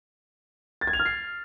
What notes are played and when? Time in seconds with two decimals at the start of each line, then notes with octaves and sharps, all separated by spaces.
0.81 A6
0.87 G#6
0.93 F7
0.99 F6
1.05 C7